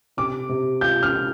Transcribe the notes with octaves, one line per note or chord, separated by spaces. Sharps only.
C3 D6
C3
F4 G6
F6
F4